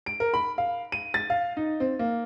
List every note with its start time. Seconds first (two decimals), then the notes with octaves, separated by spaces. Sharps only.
0.06 D7
0.20 A#4
0.34 B5
0.58 F5
0.92 D#7
1.14 A6
1.30 F5
1.57 D#4
1.80 C4
1.99 A#3